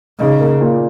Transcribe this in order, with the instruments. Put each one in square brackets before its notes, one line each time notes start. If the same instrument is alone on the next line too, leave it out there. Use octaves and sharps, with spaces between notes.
[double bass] C#3 [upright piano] D#4
[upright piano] A#3
A#2